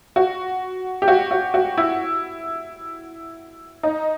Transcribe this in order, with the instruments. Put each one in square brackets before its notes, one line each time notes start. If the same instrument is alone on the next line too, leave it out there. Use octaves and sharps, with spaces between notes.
[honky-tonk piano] F#4
G4
F#4
F#4
F#4
E4
D#4